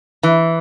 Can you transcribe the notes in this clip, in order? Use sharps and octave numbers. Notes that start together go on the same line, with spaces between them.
E3